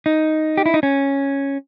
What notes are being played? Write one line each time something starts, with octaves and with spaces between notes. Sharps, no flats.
D#4
G4
E4
D#4
C#4